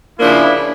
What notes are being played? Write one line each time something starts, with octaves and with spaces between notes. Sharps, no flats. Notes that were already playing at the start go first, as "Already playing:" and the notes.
C#3 F3 A#3 D4 E4